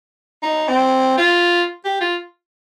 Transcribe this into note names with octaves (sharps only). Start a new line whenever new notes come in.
D#4
C4
F4
G4
F4